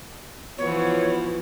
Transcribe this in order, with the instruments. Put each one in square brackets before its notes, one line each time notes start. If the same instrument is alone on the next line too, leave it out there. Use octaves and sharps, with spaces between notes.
[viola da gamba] E3 F3 F#4 [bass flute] B3 [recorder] C#5